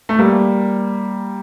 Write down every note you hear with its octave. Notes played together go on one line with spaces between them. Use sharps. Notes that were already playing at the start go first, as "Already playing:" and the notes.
A3
G3 A#3